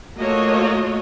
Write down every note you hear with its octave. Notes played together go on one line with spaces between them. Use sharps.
A3 A#3 F4 F#4 C#5 D#5